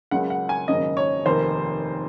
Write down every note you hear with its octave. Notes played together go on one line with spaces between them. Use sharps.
C#2 C#3 F#3 A#3 F#5
F#5
G#5
G#1 F#2 C#3 F#3 A#3 D#5
C#5
F1 D#2 D#3 A#3 C5